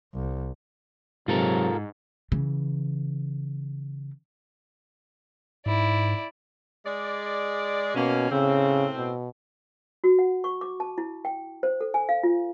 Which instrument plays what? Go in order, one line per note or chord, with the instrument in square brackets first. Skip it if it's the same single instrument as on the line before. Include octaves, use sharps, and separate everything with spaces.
[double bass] C2
[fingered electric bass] G#2 [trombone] C3 [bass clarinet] F#3 [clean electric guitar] F4 A4 A#4
[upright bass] C#3 E3
[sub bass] G#2 [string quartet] E4 D5
[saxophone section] G#3 D5
[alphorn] B2 [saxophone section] A#3 C#4
[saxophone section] A2 C4 [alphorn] C#3
[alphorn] B2
[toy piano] F#4
F#5
C#6
D6
A5
E4
G5
C5
A4
G#5
F5
F4